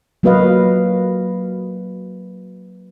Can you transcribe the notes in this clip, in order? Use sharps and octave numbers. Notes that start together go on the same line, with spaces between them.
F#3 A#3 F#4 B4 D#5 F5